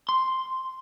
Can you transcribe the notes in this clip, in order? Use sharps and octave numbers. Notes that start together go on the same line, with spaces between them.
C6